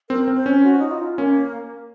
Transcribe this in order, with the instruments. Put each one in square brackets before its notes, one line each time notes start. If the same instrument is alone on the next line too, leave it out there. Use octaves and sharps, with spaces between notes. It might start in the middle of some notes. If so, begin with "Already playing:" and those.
[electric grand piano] C4 [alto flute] A#4
[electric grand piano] C4
[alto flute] C5
[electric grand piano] C#4
[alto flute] F#4
D#4
F4
[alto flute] A#3 [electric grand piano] C#4